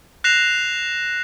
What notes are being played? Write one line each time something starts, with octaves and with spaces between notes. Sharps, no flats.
F#6 A#6 C7 E7 F7